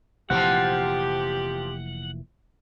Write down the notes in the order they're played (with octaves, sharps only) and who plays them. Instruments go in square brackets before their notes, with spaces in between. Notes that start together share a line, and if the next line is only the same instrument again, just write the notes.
[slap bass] F1 A#2 E3 [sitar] F3 C4 [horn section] G4 [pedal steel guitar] F#5